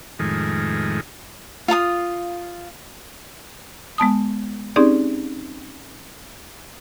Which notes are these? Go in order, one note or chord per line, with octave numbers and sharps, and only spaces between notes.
F2 A2 D#3 G#3
F4 F5 A5 D#6
G#3 B3 A5 D#6
C4 C#4 D#4 G4 G#4 D5